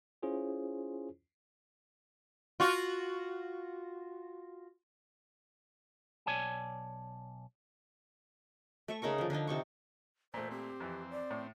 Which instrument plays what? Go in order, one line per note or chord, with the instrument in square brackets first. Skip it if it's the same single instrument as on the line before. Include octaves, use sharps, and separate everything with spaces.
[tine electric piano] C#4 E4 F4 G#4 C5 C#5
[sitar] F4 F#4
[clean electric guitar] B1 C#5 D5 G#5 A5
[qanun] A3 E5 C#6
C#3 D#4 A#4 C#6
D3 F3
D3 F3 D4 D#4
C3 D#4 C#6
[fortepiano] A#2 A3 [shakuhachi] C5
[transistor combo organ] C4 [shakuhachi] G4
[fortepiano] F2 E3
[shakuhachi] D5
[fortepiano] A2